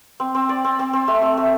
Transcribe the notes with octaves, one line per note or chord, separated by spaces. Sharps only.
C4
C4
D5
C4
C4
C4
A3
A3
A3